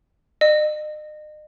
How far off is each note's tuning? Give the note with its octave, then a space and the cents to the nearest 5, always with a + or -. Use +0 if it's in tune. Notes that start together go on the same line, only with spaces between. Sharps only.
D#5 -40